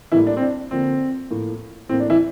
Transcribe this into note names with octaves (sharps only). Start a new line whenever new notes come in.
A2 E3 G3 A#3 E4
D4
C4
D4
D3 F3 A#3 C4
A2 F3 A#3
A2 E3 A#3 C4
D4
E3 E4